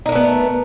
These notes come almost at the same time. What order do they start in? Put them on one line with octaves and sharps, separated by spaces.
D#4 A#4 A3 B3